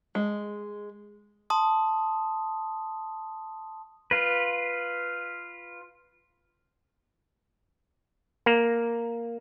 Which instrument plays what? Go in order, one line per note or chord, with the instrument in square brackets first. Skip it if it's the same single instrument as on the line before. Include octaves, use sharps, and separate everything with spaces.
[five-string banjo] G#3
[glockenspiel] A5 C6 D#6
[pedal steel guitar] F4 B4
[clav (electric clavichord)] A#3